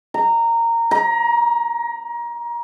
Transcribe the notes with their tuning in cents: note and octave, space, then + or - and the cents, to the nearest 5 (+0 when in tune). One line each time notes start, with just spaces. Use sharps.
A#5 -15
A#5 +25